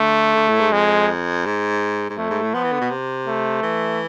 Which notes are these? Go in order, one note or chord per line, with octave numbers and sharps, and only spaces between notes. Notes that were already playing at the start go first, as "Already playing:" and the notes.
Already playing: D3 A3
D3
A2
G#2
F2 G#3
G#2
G#2
F2 A3
G#2
A2
F3 B3
E3
D3
B2
C3
A3
E3